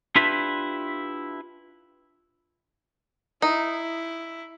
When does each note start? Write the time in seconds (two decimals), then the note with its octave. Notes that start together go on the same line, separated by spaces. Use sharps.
0.16 D4 E4 F4 G4 B4 E5
3.42 D#4 E4 D#6